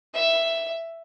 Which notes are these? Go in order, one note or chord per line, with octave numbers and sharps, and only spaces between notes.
E5